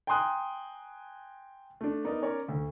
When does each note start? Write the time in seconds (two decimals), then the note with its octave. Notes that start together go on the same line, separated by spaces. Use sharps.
0.07 G5 G#5 A#5 C6 D#6 F#6
1.81 A3 D4
2.04 B3 D#4 A#4 D5
2.22 C#4 A#4 C#5 D5
2.48 D2